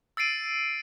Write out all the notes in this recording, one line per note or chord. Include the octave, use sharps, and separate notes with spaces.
E6 A6 C7 D7 D#7